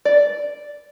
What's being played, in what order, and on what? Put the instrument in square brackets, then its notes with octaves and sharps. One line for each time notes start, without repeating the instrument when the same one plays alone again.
[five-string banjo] D5